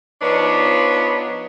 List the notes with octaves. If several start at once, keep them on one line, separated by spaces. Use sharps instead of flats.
F3 B3 D4 D#4 B4 C#5